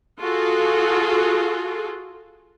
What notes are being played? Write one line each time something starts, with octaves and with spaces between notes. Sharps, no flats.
F4 F#4 G#4 A4